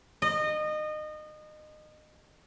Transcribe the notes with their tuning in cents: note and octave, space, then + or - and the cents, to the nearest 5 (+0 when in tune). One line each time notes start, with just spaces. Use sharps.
D#5 -25